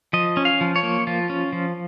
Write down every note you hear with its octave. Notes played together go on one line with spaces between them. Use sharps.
F3 D#5
C#4
F5
F3
C#5
A#3
F3 F4
C#4
F3